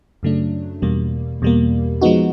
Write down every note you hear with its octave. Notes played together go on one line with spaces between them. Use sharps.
F#2 C#3 F#3 A3 D4
E2 B2 G3 A#3
E2 B2 G3 A#3
F3 G#3 B3 D#4 F#4